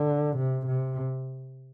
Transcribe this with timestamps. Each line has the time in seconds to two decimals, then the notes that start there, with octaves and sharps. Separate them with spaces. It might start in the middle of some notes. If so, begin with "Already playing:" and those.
Already playing: D3
0.37 C3
0.67 C3